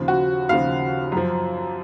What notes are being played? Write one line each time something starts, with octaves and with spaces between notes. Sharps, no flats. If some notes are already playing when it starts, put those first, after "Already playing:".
Already playing: D#2 C#3 F3
F#4
D#2 C#3 F3 F5
F#2 F3